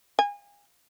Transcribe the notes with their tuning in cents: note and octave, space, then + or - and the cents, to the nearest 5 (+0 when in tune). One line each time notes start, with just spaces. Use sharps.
G#5 -30